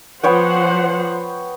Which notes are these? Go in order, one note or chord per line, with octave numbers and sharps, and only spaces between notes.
F3 B3 C5 C#5 F#5 G5